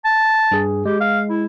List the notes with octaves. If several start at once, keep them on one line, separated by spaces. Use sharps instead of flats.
A5
G2 G#4
G#3 G4
F5
E4